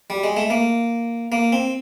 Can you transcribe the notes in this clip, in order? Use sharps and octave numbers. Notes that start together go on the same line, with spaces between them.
G3
G#3
A3
A#3
A#3
C4